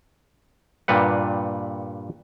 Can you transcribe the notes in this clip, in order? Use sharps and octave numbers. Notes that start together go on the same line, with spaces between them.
G2 A#2 G3 B4 F#5